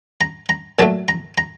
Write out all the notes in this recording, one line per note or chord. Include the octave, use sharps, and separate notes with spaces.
A#5
A#5
A#2 F#3 A3 A5
A#5
A#5